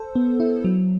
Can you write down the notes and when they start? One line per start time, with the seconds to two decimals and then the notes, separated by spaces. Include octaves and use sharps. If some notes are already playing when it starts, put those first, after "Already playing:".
Already playing: A4 C5
0.15 B3
0.40 E4
0.64 F#3